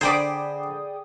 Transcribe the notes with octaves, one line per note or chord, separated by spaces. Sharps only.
D3 G#4 C5 D5 G5 B5 D6 D#6